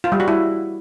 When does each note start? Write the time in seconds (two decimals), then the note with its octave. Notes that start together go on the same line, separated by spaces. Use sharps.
0.04 F4
0.12 G3
0.20 F#4
0.28 E4